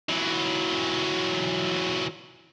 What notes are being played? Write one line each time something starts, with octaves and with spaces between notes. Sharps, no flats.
E3 F#3